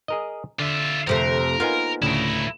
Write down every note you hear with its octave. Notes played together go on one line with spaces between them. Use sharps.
G#4 A#4 D#5
D3 F4 E5
F2 C3 A3 A#4
A#3 B3 D#4 F4 G#5
D2 A2 C#3 E4 A#4